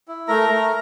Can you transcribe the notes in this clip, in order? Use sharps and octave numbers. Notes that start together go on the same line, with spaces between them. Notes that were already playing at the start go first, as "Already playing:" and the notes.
E4
A3 A#4 A#5
A3